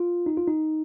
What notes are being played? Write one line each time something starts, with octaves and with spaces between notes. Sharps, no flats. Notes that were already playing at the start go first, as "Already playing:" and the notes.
Already playing: F4
D#4
F4
D#4